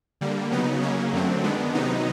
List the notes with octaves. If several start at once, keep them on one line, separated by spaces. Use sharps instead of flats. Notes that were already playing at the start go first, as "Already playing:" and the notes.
D3 G3 A#3
C#3 F#3 B3 D#4
C#3 F#3 A#3 C#4
F#2 D3 F#3 A3 C4
D#3 G#3 B3 D4
C3 D#3 F#3 B3 D#4